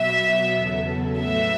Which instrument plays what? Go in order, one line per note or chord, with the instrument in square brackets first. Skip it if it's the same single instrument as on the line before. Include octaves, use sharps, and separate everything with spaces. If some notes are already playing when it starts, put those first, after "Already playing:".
Already playing: [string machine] B2 F#3 B3 [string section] E5
[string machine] E2 C#3 F#3 B3 A4
[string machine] A2 F#3 A3 F#4 [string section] E5